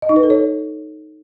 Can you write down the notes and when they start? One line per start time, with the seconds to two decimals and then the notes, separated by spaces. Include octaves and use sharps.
0.02 D#5
0.09 D#4
0.16 B4
0.23 A4
0.30 C#5